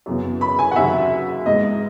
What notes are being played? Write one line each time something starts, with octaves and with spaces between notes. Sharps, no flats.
F#2 C#3 E3 B3
B5
G#5
F#5
D#2 C#3 F#3 E5
G#2 E3 G#3 D#5